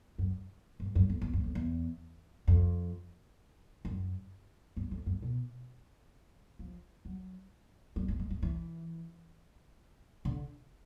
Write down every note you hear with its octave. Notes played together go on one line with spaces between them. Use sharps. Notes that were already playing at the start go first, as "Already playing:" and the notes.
F#2
G2
F#2
F2
E2
F2
F2
E2
F2
F#2
G2
F2
F#2
B2
F3
F#3
G3
G#3
G#3
G#3
E3
D3